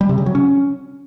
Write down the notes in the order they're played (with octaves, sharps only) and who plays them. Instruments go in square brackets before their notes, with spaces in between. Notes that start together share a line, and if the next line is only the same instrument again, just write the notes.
[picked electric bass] G3
C3
C#3
F#3
C#4